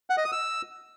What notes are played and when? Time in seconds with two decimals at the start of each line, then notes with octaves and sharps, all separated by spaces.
0.10 F#5
0.17 D#5
0.25 D#6
0.32 E6